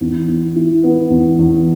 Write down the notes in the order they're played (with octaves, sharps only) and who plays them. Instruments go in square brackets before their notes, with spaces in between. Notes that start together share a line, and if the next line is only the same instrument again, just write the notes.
[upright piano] E2
E2
E3
B3
E2
E2